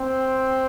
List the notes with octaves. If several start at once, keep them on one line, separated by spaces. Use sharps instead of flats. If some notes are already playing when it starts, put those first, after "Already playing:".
Already playing: C4